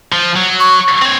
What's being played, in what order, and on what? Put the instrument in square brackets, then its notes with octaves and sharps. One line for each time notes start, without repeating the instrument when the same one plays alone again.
[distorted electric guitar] F3
F#3
[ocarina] C#6
[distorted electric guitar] C4 C#5